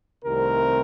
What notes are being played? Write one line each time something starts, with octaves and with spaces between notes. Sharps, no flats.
C2 C3 D#3 A3 C4 A#4